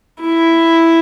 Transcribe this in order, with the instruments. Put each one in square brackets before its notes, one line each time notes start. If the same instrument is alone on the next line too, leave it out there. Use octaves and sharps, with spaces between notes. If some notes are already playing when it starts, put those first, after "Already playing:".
[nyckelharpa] E4